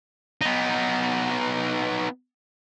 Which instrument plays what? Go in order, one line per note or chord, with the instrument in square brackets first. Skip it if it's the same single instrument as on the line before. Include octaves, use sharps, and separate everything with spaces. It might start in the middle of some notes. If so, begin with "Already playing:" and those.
[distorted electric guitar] B3 D#4